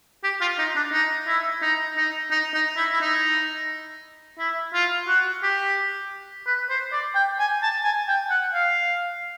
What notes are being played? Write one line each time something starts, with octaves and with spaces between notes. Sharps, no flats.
G4
F4
D#4
D4
D#4
E4
D#4
D#4
D#4
D#4
E4
E4
D#4
E4
F4
F#4
G4
B4
C5
D5
G5
G#5
A5
G#5
G5
F#5
F5